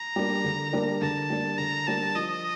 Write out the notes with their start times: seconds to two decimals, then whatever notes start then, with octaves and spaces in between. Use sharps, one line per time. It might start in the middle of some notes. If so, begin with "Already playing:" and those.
Already playing: A#5
0.16 G3 A#3 D4
0.45 D3
0.73 G3 A#3 D4
1.02 D3 A5
1.30 G3 A#3 D4
1.58 D3 A#5
1.87 G3 A#3 D4 A5
2.16 F3 D#5